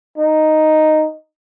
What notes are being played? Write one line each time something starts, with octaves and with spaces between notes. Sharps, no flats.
D#4